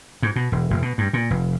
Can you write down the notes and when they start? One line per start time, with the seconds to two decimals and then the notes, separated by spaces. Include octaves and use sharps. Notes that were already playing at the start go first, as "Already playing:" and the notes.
0.22 G#2
0.36 B2
0.52 E1
0.70 F1
0.82 B2
0.98 G2
1.13 A#2
1.30 F1